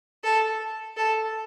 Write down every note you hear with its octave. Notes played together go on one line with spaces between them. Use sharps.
A4
A4